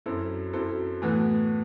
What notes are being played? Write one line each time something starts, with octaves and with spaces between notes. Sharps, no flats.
F#2 F#3 C4 E4 A4
F#2 F#3 C4 E4 A4
A2 E3 B3 F#4